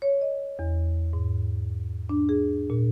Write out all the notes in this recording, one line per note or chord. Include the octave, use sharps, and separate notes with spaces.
C#5
D#5
E2
G#2
D4
G#4
A#2